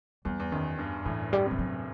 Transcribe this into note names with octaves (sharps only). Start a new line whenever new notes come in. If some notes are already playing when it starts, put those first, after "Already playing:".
E2 G3
E2
F#2 D#3
G2
A2 E3
G3
C3
G3
F#3